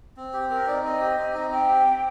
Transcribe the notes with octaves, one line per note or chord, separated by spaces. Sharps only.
C4
G4
C4 A#4
D#4 D5
C4 D#5
G4
C4
D#4
C4 G5
G4
C4